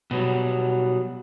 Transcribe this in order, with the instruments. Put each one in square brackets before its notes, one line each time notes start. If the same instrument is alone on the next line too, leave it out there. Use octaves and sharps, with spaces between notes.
[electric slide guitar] B2 F#3 G3